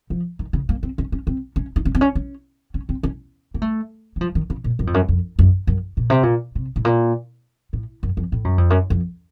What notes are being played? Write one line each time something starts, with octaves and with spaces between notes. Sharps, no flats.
F3
D#3
C#3
A#3
C4
C#4
C#4
C4
C#4
D#4
C#4
C4
C#4
C#4
C#4
C4
C#4
A#3
A3
F#3
F3
D#3
C#3
A#2
F#2
F2
F#2
F2
F#2
F#2
A#2
C3
A#2
C3
A2
A#2
A2
F#2
F2
A2
F#2
F2
F#2
F2